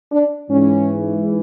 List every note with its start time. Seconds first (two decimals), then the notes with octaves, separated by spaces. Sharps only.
0.12 D4
0.49 G#2 E3 C#4